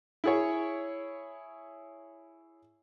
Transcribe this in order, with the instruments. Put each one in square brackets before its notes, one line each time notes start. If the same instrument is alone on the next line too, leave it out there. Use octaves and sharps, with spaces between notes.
[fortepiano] E4 G#4 C#5